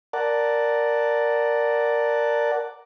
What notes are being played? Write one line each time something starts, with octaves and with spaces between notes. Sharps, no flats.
A#4 D5 F#5 A5